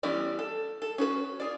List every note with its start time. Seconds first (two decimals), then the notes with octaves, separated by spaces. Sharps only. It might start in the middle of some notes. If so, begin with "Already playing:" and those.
0.03 E3 G3 B3 C#4 D5
0.39 A4
0.82 A4
0.98 C#4 F#4 B4
1.40 F4 G#4 D5